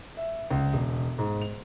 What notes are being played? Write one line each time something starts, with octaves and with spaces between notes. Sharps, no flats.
E5
C#2
E1
G#2
F7